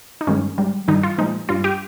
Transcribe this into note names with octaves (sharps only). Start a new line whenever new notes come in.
D#4
G2 D#3 G#3 C#4
G#2 G3
G2 D#3 G3 D#4
F4
A#2 F3 G#3 D#4
G2 G3 F4
G4